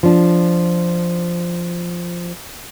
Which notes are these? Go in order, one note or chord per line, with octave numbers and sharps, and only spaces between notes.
F3 D4